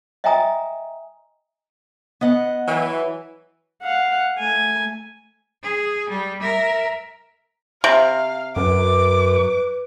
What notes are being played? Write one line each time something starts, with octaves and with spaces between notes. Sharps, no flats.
D#5 E5 G5 G#5 A#5 D#6
B3 D#5 F#5
E3 F#3
F5 F#5
A3 G#5
G#4
G3
A#4 E5
C3 F5
F#2 B4 D6